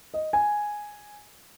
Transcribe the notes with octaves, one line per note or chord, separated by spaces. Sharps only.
D#5
G#5